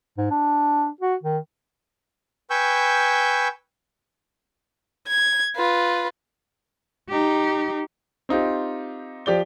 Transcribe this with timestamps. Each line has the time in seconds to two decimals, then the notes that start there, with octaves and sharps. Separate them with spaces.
0.18 G#2
0.30 D4
1.01 F#4
1.23 D#3
2.50 B4 G5 G#5 C#6 E6 G6
5.07 G#6
5.56 F4 B4
7.09 D#4 G4
8.29 C4 D#4 F4 G4
9.26 F3 G4 D5 G7